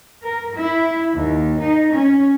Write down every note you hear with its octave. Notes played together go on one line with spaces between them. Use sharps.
A#4
E4
D#2
D#4
C#4